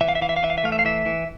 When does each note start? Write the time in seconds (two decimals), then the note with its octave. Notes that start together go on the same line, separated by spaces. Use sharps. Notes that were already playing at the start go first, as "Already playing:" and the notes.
0.01 E3 E5
0.09 F5
0.15 E5
0.21 E3 F5
0.29 E5
0.36 F5
0.43 E3 E5
0.50 F5
0.58 E5
0.64 A3 F5
0.72 E5
0.79 F5
0.85 E3 E5
1.06 E3